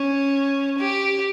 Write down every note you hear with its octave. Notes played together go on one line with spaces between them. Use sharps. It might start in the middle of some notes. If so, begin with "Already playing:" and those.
Already playing: C#4
G4